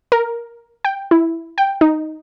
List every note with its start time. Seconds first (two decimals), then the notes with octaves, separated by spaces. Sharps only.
0.12 A#4
0.85 G5
1.11 E4
1.58 G5
1.81 D#4